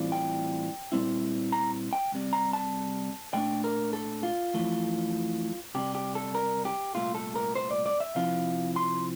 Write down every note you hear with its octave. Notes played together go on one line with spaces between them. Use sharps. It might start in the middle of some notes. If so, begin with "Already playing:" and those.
Already playing: A2 E3 G3 C4 F4
G5
A#2 G3 C4 E4
A#5
G5
C2 C3 G3
A#5
A5
A#2 A3 D4 G5
A#4
A4
F4
F2 E3 A3
C2 C3 G3 G4
G4
A4
A#4
G4
C2 A#2 A3 F4
A4
A#4
C5
D5
D5
E5
C3 F3 C4 E4 F5
C6